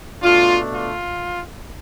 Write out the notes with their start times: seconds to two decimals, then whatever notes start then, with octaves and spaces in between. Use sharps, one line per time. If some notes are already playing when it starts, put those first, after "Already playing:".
0.22 B2 A3 D4 F4
0.71 F4